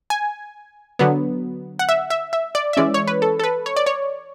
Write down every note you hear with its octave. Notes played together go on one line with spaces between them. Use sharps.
G#5
D3 F#3 B3
F#5
E5
E5
E5
D5
E5
E3 G#3 C#4 D5
C#5
B4
A4
A4
B4
C#5
D5
C#5